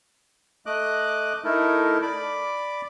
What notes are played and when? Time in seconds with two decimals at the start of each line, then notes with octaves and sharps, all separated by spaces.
0.66 A3 D#5 D6 F#6
1.44 A3 D#4 E4 A4 A#4
2.02 D5 B5 D6